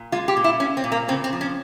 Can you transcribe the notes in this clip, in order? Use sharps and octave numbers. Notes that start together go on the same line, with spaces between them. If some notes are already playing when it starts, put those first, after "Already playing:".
Already playing: A#2
G#3 F4
G4
A#2
E4
A#2 C#4
C4
A#2
A#3
C#3 C4
C4
F3
C#4